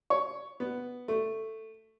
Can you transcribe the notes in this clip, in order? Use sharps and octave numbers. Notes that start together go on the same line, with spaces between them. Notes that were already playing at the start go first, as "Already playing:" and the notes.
C#5
B3
A3